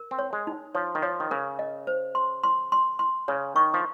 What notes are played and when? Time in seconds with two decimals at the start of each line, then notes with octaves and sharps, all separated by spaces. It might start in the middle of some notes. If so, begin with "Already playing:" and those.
Already playing: A#4
0.11 C4
0.19 C#5
0.33 G#3
0.47 D#4
0.75 F3 C#5
0.95 D#3
1.02 F3 C#5
1.20 D#3
1.31 C#3 A#4
1.59 D#5
1.87 C5
2.15 C6
2.44 C6
2.72 C6
2.99 C6
3.28 C#3 C#5
3.56 D#3 C#6
3.74 F3